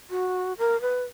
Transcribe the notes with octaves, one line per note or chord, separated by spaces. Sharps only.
F#4
A#4
B4